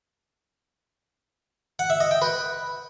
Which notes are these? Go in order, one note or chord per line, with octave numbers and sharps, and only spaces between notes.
F#5
E5
D#5
G5
B4